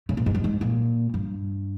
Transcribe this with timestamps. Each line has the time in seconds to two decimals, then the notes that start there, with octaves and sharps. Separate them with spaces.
0.09 C#3
0.17 A#2
0.26 G#2
0.34 G2
0.44 G#2
0.61 A#2
1.14 G2